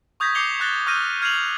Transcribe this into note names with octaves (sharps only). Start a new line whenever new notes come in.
C#6 D#6 G6 G#6 A#6 B6
D6 G6 C7 C#7 F7 G7
C#6 F#6 A6 A#6 G7
C#6 D#6 F6 G6 A#6 D#7
F6 G#6 C7 D#7 F7 F#7